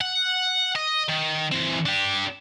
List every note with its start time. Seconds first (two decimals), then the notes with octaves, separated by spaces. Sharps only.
0.01 F#5
0.76 D#5
1.09 D#3
1.52 E3 C4
1.86 D4 G4